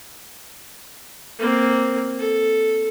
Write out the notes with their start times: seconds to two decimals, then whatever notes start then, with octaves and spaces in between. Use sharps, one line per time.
1.39 A#3 C4
2.19 A4